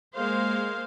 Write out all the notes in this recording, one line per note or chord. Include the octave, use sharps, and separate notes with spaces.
G#3 A#3 C5 F5